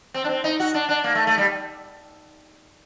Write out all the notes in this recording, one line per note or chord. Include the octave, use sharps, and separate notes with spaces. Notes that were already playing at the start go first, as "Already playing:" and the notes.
C4
D4
C4
D#4
F#4
D4
D4
A#3
A3
A3
G3